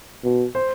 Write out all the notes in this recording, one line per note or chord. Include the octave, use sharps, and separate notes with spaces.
B2
C5